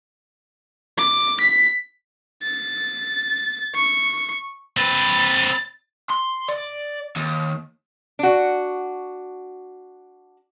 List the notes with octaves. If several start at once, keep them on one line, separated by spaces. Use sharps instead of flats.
D6
B6
A6
C#6
C4 B4 A6
C6
D5
D#2
D4 F#4